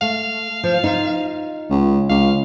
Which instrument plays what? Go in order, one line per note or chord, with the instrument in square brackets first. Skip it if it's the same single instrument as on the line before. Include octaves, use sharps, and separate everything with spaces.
[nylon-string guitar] A3 [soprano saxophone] F5
[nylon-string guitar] F3
D#4 F4
[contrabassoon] C#2
[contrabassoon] C#2 [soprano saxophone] F5